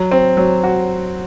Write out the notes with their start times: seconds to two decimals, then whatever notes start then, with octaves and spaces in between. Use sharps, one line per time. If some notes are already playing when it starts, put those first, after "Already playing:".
Already playing: F#3
0.12 C4
0.37 F#3
0.64 F#4